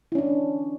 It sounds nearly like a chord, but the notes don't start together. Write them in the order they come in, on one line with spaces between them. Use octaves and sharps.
E4 C#4 D4